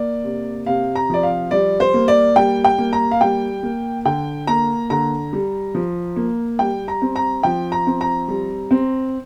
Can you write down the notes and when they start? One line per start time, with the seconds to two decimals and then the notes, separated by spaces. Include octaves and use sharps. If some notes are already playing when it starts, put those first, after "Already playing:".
Already playing: A#3 D5
0.24 C3
0.66 C3 F5
0.95 A#5
1.10 F3 D5
1.23 F5
1.51 G3 D5
1.80 C5
1.94 A#3
2.08 D5
2.36 G3 G5
2.64 G5
2.78 A#3
2.93 A#5
3.11 F5
3.21 G3 G5
3.63 A#3
4.05 D3 G5
4.47 A#3 A#5
4.90 D3 A#5
5.33 G3
5.75 F3
6.16 A#3
6.59 G3 G5
6.88 A#5
7.02 C4
7.16 A#5
7.43 F3 G5
7.72 A#5
7.87 C4
8.01 A#5
8.28 G3
8.71 C4